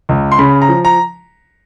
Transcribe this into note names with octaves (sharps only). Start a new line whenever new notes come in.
C#2
C6
C#3 B5
A#5
F3
A#5